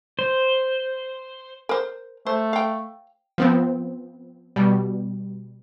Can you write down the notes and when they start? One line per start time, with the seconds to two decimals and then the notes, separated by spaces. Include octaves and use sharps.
0.19 C5
1.69 A#4 C5
2.27 A3 C5
2.53 F5 G5
3.38 F3 B3 C4
4.56 B2 G3